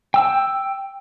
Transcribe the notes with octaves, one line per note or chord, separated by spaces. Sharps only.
G5 E6